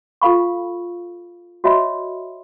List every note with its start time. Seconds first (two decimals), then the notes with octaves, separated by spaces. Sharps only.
0.22 F4 A4 F5 B5 C#6
1.64 F#4 C#5 D#5 E5 B5 C6